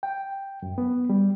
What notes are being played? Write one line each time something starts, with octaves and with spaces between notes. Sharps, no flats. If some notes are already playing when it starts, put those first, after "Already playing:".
G5
F#2
B3
G3